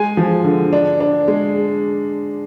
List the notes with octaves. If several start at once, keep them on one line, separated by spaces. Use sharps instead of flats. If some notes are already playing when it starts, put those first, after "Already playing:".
Already playing: G#3 G#5
F3
D3
D4
D4
G#3